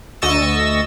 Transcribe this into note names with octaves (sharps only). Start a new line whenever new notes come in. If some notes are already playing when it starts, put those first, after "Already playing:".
D2 D#5 C#6 E6 A6 E7